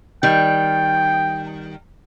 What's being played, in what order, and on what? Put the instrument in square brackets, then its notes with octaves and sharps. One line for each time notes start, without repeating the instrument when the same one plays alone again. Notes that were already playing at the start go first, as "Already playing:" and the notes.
[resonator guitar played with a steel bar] D#3 G3 [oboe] G5